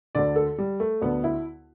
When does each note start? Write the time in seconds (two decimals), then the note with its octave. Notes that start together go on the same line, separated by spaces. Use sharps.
0.15 D2 D3 D5
0.36 A4
0.58 G3
0.80 A3
1.02 D2 D3 B3
1.24 E4